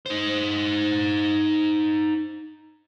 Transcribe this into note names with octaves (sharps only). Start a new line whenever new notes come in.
D#4 C5